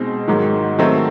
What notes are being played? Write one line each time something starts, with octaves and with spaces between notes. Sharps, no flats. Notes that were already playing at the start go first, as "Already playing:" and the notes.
Already playing: B2 G#3 C4 D#4
G#2 D#3 F#3
D#3 F#3 A3 C4